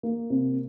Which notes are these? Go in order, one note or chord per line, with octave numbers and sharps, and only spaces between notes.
A#3
C3